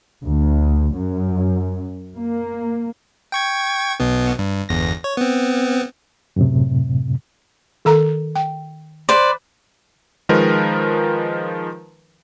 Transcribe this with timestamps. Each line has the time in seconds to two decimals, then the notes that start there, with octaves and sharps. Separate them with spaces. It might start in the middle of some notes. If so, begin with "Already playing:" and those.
0.23 D2
0.96 F#2
2.16 A#3
3.32 G5 C#6 G#6
4.00 B1 B2 B3
4.39 G2
4.69 G1 E2 A#6
5.04 C#5
5.17 B3 C4
6.36 F#2 A2 C3
7.85 D#3 A4 A#5
8.35 G5
9.09 B4 C5 D5
10.29 D#3 F3 G#3 A#4 B4